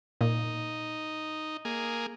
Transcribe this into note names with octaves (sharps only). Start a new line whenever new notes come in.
A#2 D#4
A#3 G#4